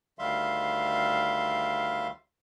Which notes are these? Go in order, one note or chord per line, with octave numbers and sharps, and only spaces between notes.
D2 D#3 G3 E5 F5 C6